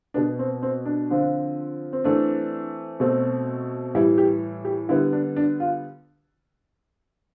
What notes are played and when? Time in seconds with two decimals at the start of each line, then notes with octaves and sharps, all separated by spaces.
0.14 B2 B3 D4
0.39 C4
0.62 C4
0.85 D4
1.10 D3 F3 C4
1.93 C4
2.04 E3 A3 C4 D4
3.00 B2 A3 C4
3.95 A2 E3 G3 E4
4.18 G4
4.65 G4
4.89 D3 G3 B3 E4
5.13 D4
5.37 D4
5.60 F4